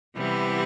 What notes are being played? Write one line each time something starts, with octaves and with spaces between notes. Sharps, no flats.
C3 E3 G3 B3 E4